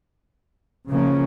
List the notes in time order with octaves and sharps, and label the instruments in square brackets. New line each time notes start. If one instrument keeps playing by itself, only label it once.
[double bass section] C#3 F3 A#3 C#4